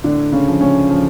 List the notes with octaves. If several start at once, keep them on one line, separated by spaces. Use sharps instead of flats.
A2 D3 D4
C#3 C#4
F3
C#3 C#4
F3